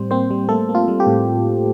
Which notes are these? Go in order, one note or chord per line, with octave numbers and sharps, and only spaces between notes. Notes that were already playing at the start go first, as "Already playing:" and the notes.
Already playing: A2 G3 C4 C5
A#3 C4 C5
G3
A3 A#3 A4
A#3
F4
G3
G4
A2